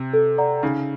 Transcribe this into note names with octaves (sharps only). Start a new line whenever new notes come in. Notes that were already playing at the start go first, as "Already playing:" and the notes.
Already playing: C3
A4
D5 F#5 A#5
C#3 D#4